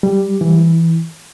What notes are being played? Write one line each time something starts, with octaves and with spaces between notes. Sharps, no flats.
G3
E3